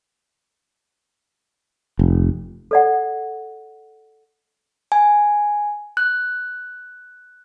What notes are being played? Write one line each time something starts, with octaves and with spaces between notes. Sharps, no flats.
F1
A4 D5 F#5
G#5
F#6